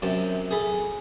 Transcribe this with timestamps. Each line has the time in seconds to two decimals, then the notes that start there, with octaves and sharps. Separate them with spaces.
0.02 F#2 C3 A5
0.51 G#4 A4 B5